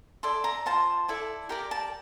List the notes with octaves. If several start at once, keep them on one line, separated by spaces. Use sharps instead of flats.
E4 A4 D5 C6
A#5
F4 C5 A5
E4 A4 D5
G4 A#4 D5
A5